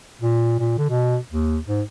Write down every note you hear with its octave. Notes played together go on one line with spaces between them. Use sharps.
A#2
A#2
D3
B2
D#2
G#2